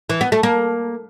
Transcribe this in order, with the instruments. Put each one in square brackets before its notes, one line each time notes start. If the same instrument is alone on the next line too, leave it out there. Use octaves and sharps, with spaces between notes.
[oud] E3
B3
A3
A#3